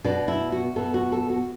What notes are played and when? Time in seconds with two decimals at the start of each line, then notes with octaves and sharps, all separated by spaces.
0.04 B2 B3 D4
0.28 E4
0.52 F#4
0.76 B2 B3 A4
0.94 F#4
1.12 A4
1.30 F#4